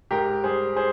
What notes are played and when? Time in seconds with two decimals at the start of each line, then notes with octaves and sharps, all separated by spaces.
0.11 G#2 G4 A#4
0.44 G3 G#4 C5
0.76 G#4 C5